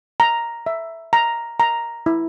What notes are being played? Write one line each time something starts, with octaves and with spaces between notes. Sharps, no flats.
A#5
E5
A#5
A#5
E4